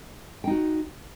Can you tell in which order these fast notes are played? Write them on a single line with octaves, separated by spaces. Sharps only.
G5 D#4 F#4